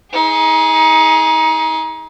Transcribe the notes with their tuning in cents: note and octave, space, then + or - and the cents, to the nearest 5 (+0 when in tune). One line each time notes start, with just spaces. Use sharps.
D#4 +30 G#4 +0